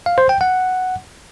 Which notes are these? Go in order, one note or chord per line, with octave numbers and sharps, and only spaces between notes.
F5
C5
G5
F#5